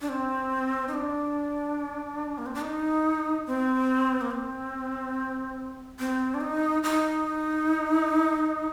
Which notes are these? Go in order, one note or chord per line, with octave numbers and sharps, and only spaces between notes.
D4
C4
D#4
D4
A#3
C4
D4
D#4
C4
A#3
C4
C4
D4
D#4
D#4